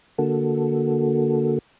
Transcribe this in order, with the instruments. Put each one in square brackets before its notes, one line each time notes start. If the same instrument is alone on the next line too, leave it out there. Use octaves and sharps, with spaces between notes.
[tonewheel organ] D3 A#3 F#4 A4